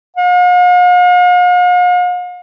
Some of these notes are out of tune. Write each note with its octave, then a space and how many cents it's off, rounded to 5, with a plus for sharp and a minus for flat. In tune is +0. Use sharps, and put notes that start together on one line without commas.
F5 +45